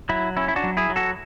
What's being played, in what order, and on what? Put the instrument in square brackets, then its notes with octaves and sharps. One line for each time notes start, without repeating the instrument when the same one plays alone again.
[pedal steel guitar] F#3 E4
C#4 E4
E4
D4 F#4
F#3
E4 G#4
F#3
F#4 A4